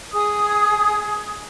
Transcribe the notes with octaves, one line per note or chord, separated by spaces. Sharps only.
G#4 D#6